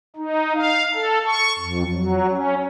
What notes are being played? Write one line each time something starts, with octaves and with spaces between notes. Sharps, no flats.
D#4
F5
A4
C#6
F2
F#3
C#4